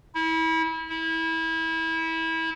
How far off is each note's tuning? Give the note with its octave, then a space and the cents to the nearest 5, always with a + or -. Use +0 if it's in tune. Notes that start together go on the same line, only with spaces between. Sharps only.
E4 -30
E4 -25